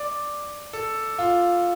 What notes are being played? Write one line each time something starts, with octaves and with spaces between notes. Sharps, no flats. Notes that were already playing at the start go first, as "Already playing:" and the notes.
Already playing: D5
A4
F4